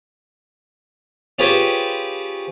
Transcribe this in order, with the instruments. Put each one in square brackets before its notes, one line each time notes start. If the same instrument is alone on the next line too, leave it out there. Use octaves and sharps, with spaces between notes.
[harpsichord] C#4 F4 G4 G#4 B4 C5